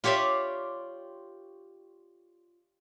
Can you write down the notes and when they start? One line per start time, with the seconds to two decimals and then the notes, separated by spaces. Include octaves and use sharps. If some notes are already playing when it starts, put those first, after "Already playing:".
0.04 F4 G4 C#5 D5 E5 F5